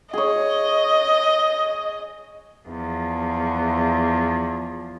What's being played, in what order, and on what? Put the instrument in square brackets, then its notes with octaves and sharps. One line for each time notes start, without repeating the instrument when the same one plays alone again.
[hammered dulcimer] G#4 C#5 [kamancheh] D#5
[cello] E2 F3